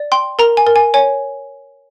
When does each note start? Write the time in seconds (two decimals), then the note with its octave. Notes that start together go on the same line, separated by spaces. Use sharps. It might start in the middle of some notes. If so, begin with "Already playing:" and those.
Already playing: D5
0.12 G5 C6
0.39 A#4 A#5
0.57 G#5
0.67 A#4
0.76 G#5
0.94 C#5 G#5